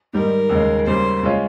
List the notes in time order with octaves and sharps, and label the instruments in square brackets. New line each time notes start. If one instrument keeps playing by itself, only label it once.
[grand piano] G#2 D#3 G3 [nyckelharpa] A#4
[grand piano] D#2 C#3 G#3
[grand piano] C#3 G3 A#3 [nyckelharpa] C5
[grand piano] C#3 G#3 C#4 F4